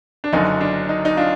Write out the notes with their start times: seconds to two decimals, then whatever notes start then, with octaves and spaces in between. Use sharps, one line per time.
0.24 D4
0.33 F#1 F#2 D3 D#4
0.61 D4
0.89 D#4
1.05 D#4
1.17 D4 F4